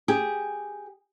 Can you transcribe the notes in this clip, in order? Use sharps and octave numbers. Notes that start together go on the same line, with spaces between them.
G4 G#4